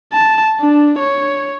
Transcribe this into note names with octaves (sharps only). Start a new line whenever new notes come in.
A5
D4
C#5